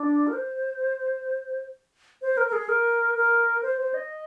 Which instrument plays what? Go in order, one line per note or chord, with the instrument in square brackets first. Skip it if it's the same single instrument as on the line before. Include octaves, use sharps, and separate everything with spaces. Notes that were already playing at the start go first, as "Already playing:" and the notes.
Already playing: [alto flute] D4
A#4
C5
C5
A#4
A#4
G#4
A#4
A#4
C5
C5
D#5